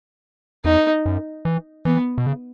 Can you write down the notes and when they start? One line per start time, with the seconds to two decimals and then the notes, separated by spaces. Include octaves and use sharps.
0.65 E2 D#4
1.06 F#2
1.45 E3
1.85 E3 B3
2.18 B2
2.27 C#3